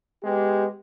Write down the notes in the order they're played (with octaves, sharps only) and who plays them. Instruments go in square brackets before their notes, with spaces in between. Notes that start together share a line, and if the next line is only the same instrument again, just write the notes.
[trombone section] G#3 B3 G4